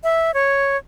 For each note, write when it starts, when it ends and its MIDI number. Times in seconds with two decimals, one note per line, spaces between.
0.04 0.34 76
0.34 0.77 73